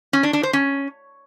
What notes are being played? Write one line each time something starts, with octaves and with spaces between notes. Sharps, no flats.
C#4
D4
D4
C5
C#4